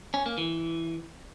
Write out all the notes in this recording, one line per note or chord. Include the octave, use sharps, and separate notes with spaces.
C#4
A#3
E3